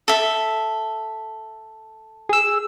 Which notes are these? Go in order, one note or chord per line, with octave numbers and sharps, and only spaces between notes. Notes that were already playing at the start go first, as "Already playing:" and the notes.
A4 E5
G#4 E6